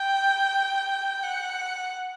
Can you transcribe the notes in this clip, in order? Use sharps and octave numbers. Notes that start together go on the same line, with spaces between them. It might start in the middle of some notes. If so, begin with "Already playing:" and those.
Already playing: G5
F#5